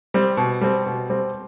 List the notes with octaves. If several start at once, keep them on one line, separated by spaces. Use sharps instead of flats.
G3 C4
B2
G3 C4
B2
G3 C4